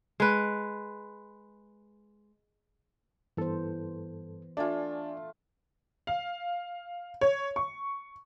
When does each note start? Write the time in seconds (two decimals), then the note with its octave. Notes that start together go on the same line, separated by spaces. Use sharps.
0.20 G#3 B4
3.37 G2 E3 B3 A4 C5
4.57 A3 D4 F4 D5 G#5 A5
6.07 F5
7.21 C#5
7.56 C#6